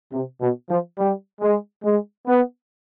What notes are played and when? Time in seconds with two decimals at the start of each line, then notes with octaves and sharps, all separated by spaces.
0.13 C3
0.42 B2
0.70 F3
0.98 G3
1.41 G#3
1.84 G#3
2.27 B3